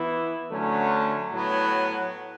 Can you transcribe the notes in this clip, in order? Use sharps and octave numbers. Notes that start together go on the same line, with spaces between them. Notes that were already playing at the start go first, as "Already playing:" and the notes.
Already playing: E3 B3 E4
D3 F#3 A3 C#4
A2 F#3 B3